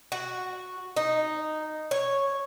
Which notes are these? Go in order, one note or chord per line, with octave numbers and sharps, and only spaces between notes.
F#4
D#4
C#5